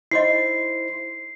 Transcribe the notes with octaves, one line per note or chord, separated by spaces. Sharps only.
D#4 E4 C5 D#5 C6 C7